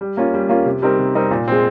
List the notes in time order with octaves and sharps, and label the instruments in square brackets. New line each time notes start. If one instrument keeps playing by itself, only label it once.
[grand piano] G3
A#3 C#4 F4
G3
A#3 C#4 F4
C3
G3 C4 D#4 A#4
C3
G3 C4 D#4 A#4
A#2
G#3 C4